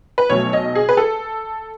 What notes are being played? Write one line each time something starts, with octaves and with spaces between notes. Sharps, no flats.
B4
B1 B2 F#3 A3 C#5
D#5
G#4
B4
A4